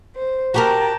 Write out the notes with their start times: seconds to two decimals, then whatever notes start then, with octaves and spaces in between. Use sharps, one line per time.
0.16 C5
0.54 F#4 G4 A#4 G5 A5 A#5